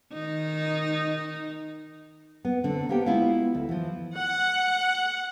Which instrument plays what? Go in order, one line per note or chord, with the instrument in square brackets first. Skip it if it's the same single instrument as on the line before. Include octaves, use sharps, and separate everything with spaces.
[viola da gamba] D#3 D#4
[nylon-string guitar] B3
D3 C4
A#3 B3 G4 C5 G5
G#3 B3 E4 F4 E5 F5
D2
E3 F3
[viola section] F#5